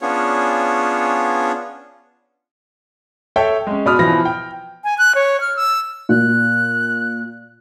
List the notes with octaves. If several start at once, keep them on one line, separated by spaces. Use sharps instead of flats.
B3 C#4 D4 F4 G#4 C#5
A4 C#5 E5 G5
G#3 C#4
B2 D5 B5 D#6 F6
B2 E3 F3 B5 A#6
G5
G#5
F#6
C#5
F6
E6
A#2 F#6